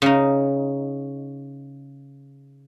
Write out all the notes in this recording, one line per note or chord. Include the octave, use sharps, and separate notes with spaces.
C#3 D#4